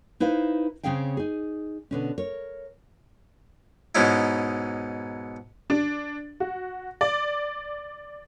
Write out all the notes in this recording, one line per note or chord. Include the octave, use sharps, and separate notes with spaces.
D#4 E4 B4 C5 F5
C#3 C4 C#4 G#4 F5 G5
D#4 G#4
B2 D3 C#4
A#4 C#5
G#2 B2 G#3 C#4 D#4 E4
D4
F#4
D5